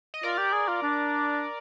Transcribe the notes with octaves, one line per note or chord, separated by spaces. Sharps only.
D#5
F4 A#4 D5
G4
G#4
F4
D4